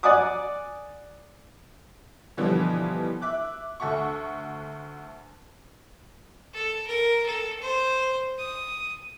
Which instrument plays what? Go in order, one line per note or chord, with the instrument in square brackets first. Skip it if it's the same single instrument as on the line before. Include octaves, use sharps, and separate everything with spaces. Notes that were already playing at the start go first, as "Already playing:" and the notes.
[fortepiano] D5 F#5 G#5 D6 D#6
[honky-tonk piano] B2 D3 E3 F3 G3 B3
E5 D6 F#6
D2 A4 E5 F#5 C#6
[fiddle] A4
A#4
A4
C5
D#6